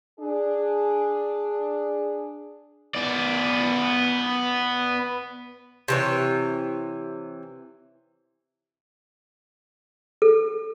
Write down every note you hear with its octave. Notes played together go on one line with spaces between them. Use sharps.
D4 G#4
B3 D5
C3 E3 C#5
A4